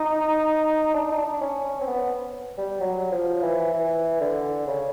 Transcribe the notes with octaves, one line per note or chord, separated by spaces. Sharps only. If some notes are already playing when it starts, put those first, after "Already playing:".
Already playing: D#4
D4
D#4
D4
C#4
C#4
C4
B3
G3
F#3
F3
E3
E3
D3
C#3